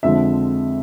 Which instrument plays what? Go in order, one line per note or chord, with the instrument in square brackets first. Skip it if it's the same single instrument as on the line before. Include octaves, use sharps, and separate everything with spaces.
[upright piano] F2 D3 F3 G#3 C4 E5